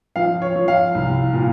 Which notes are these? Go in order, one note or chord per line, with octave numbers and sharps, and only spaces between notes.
F3 F5
C#5
F3
F5
C2
A#2